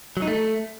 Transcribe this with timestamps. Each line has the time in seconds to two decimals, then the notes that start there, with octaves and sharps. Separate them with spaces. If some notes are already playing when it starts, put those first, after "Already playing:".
0.17 F#3
0.22 D#4
0.28 A3